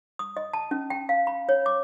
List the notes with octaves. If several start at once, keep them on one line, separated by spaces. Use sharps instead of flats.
D#6
D#5
A5
C#4
G5
F5
B5
C#5
D6